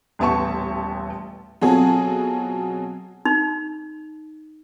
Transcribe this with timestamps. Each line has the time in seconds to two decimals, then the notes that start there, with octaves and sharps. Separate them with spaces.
0.19 D#1 A1 B3 E5 A5 C#6
1.61 B2 F#3 C4 F4 G#4 A4
3.25 D#4